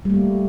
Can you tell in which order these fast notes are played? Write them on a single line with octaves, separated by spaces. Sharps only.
G3 A3 A#3